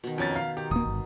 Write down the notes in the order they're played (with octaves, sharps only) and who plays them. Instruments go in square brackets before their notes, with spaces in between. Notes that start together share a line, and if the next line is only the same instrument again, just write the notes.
[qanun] B2 D#3
[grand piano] F2 C#4 A6
F5
[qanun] D#3 [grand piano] G4
[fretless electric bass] D1 A#3 [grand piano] D#6
[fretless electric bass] G1